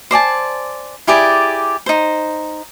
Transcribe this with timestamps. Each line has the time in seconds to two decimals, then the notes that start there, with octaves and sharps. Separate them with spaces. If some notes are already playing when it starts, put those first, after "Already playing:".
0.11 C5 D5 G#5 A5
1.07 E4 G4 G#4 D5
1.86 D#4 C5